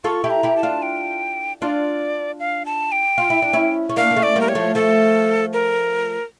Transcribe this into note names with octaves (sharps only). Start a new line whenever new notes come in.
F4 A4 C#6
E4 G4
A#5
E4 G4
A5
D4 F4
G5
D4 F4 D5
F5
A5
G5
F4
E4
D4
C#4 E4
C#4
A#3 D4 F5
A#3
A3 C#4
D5
G3 A#3 A#4
C#5
F3 A3
F3 A3 A4
A#4